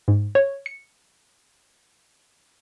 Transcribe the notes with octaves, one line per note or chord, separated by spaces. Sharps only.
G#2
C#5
C#7